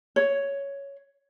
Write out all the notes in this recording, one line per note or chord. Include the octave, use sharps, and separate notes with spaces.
C#5